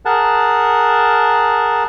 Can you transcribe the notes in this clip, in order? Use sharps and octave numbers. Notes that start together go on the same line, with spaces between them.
G#4 A#4 F#5 A5